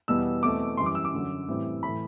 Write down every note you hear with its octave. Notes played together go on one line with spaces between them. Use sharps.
E2 B2 G3 B3 E6
E2 B2 A3 C4 D6
F#2 E3 G3 C6
D6
E6
D6
F#2 D3 F#3
A2 E3 G3 C4
A2 E3 A3 B5